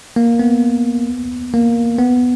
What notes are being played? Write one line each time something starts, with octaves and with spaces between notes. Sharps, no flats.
A#3
B3
A#3
B3